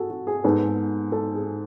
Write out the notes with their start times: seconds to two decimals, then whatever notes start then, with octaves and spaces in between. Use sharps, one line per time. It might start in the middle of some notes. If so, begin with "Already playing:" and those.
Already playing: F#4 G#4 A4
0.10 F#4
0.27 G#4
0.44 G#2 G#3 B3 A4
1.12 A4
1.35 G#4